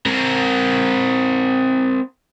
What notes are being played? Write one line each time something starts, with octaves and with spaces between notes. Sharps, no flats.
C4 A#4